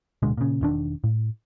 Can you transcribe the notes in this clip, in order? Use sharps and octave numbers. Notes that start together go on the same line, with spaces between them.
D1 B2 D3 G#3
A#2 C#3
E1 D#3 D4
A2